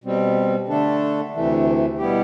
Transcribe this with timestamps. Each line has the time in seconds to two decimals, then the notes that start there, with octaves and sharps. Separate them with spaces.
0.04 B2 G3 C4
0.68 D3 A3 D4 A4
1.34 D2 C3 E3 A3
1.98 B2 G3 B3 E4 G4